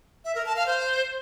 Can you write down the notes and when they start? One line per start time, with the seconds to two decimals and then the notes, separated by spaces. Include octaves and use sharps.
0.25 E5
0.35 A#4
0.46 A5
0.56 F5
0.66 C5